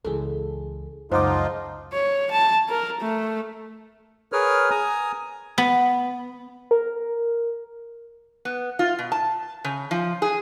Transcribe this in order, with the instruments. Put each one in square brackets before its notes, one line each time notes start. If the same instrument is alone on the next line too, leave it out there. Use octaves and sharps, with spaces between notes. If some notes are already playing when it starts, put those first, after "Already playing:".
[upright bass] C#2 E3 [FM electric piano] G#4 A4
[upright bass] C#2 [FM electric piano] F#2 F#5 D6 [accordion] F3 D#4 F4 [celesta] C5
[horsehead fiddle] C#5
A5
A#4
A3
[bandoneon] G#4 A#4 B4 C#5 F6
G#5 A#5 D#6
[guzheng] B3
[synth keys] A#4
[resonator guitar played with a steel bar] B3
F4
B2
A5
C#3
F3
G#4